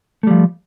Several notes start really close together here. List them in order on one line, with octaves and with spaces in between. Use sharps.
A3 G3 F3